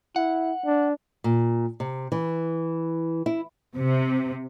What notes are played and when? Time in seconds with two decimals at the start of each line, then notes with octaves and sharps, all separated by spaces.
0.16 E4 F#5
0.66 D4
1.24 A#2
1.80 C3
2.12 E3
3.26 E4
3.77 C3